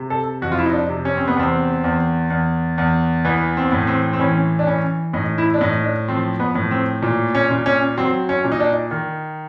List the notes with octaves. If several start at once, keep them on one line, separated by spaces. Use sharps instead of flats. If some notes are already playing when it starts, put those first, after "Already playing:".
Already playing: C3
A4
F2 F#4
F4
E4
D#4
D4
C3
C#4
C4
B3
E2 C4
E2
E2
E2
E3 B3
C4
A2
C4
C4
E3 C#4
D4
E3 C#4
A2 D#4
E4
D4
A2 D#4
D4
F3 C4
B3
A2
C4
A#2
C#4
A#2
C#4
F#3 C4
C#4
A#2
D#4
D4
D#3